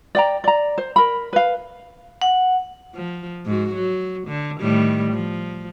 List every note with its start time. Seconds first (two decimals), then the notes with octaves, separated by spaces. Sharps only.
0.15 D5 G5 A#5
0.44 D5 A#5
0.78 C5
0.96 A#4 B5
1.33 B4 F5
2.22 F#5
2.94 F3
3.46 G#2 F#4
3.75 F#3
4.28 D3
4.61 A2 D#3 G3
5.13 F3